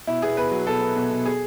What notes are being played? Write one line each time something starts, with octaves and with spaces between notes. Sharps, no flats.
B2 E4
B3 G#4
B2 B4
F#3
B2 A4
B3
B2
B2
G#4